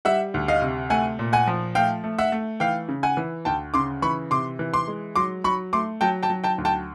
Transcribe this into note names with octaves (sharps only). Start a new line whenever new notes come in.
G3 E5 F#5
D2
D#5 F5
C3
A3 F#5 G#5
A#2
F#5 G#5
F3
A3 F5 G5
A3
E5 F#5
A3
E3 F5 G5
C#3
F#5 G#5
E3
D2 G5 A5
C#3 C6 D6
E3 B5 C#6
C3 C6 D6
E3
C6 D6
G#3
F#3 C6 D6
F#3 B5 C#6
A3 C6 D6
F#3 G5 A5
G5 A5
F#3
G5 A5
D2
G5 A5